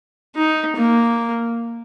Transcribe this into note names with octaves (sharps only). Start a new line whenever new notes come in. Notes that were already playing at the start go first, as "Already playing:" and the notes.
D#4
A#3